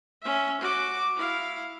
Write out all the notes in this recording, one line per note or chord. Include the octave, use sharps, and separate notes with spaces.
C#4 E5
F#4 D6
E4 F5